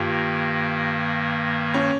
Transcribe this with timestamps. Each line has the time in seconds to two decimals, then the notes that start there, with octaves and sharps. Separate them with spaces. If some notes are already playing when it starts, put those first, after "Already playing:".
Already playing: G2 D#3 A#3 F4 G4
1.74 C#4